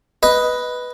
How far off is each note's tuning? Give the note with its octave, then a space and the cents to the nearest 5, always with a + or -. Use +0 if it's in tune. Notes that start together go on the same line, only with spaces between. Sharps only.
B4 +0 D#5 +10